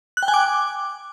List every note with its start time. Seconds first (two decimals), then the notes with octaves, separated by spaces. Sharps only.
0.17 F#6
0.23 G5
0.28 G#5
0.34 D6